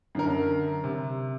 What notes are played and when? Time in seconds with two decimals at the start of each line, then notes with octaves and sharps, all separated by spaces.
0.15 F#2 D3 A#4
0.84 C3